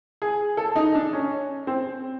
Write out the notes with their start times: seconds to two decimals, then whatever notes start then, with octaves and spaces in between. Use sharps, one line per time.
0.22 G#4
0.57 A4
0.76 D#4
0.95 D4
1.13 C#4
1.67 C4